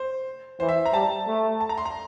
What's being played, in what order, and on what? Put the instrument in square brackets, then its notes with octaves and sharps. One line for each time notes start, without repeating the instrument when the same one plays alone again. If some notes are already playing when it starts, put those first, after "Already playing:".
Already playing: [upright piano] C5
[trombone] E3 [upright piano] C5
[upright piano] E5
A#5
[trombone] G3 [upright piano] A5
[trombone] A3
[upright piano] A5
A#5
C6
A#5